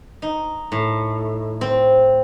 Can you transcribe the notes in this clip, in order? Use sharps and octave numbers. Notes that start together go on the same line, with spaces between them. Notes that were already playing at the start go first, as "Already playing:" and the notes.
D#4
A2
C4